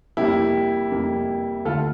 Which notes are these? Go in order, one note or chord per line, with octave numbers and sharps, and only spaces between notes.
F2 C3 G3 A#3 E4 G4
F2 C3 G3 A#3
D2 D3 A3 F4 A4